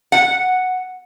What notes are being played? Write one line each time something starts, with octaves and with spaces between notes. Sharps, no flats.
F#5